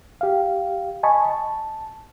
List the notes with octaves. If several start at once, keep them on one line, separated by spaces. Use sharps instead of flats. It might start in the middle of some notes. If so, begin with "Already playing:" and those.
G4 F5
D#5 G#5 A5 B5 C#6
A5